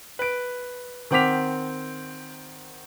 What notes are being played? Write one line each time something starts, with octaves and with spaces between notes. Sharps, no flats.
B4 D7
D#3 C4 F#5 D6 B6 F7